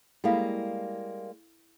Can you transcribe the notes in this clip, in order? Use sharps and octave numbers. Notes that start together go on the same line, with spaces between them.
G3 G#3 A#3 E4 A4 F5